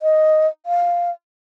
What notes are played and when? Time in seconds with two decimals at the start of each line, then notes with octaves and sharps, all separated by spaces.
0.02 D#5
0.66 F5